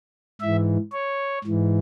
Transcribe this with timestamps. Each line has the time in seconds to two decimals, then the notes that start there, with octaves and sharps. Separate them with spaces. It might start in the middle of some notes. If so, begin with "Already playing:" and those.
0.41 G#2 E3 E5
0.92 C#5
1.44 G#2 E3